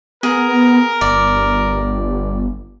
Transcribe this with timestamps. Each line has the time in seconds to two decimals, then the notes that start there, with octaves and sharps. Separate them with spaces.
0.23 B3 G#4 A#4
1.01 G1 D5